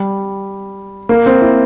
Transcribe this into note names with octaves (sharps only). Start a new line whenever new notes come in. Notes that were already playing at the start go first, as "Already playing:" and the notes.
Already playing: G3
A#3
C4
E4